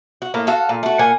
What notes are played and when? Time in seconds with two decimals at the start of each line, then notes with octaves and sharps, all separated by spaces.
0.22 F#4
0.34 A2 A#3 A#4
0.47 F#4 A4 F5
0.69 A#2
0.83 A3 F#4
0.99 A#2 A#3 F#5 G#5